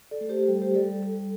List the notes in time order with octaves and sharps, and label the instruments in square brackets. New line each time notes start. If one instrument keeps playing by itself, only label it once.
[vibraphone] A4 D5
A3
G4 C5
G3 A4
G4 C5
G3 A4 D5
A4
G3 A4